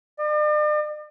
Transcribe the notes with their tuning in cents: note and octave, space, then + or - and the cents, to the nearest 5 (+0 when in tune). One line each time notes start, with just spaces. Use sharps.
D5 +45